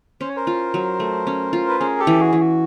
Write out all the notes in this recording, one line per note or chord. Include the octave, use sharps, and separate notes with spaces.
C#4 C5
C#5
A#4 C5
F4
F#3
A3
C#4
F4
B4
C#4 G#4 A#4
G4 A4
E3
F#4 G#4
E3
F#4